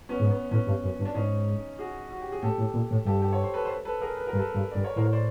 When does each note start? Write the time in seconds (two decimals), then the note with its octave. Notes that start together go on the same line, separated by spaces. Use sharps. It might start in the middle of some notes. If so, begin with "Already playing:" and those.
0.09 B3 C#4
0.20 G#2
0.31 B3
0.51 A2 B3 C#4
0.67 G2
0.84 F#2
0.99 G2
1.05 D4
1.15 G#2 C#4 D#4
1.79 F#4 G#4
2.11 F#4
2.21 G4
2.32 G#4
2.42 A2 G4 A4
2.58 A2
2.74 A#2
2.91 A2
3.05 G2 G4 A4
3.21 G4 A4
3.33 C#5
3.43 C5
3.54 A4 B4
3.65 C5
3.70 A4 B4
3.85 A4 B4
4.01 G#4 A#4
4.17 B4
4.27 A#4
4.33 G2
4.38 A4 B4
4.55 G2
4.71 G2 D5
4.84 C#5
4.96 A2 A#4 C5
5.05 C#5
5.13 C5 D5